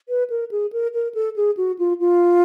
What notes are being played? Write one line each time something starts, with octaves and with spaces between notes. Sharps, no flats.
B4
A#4
G#4
A#4
A#4
A4
G#4
F#4
F4
F4